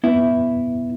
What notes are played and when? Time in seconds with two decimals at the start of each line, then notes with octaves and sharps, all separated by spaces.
0.04 B3 E4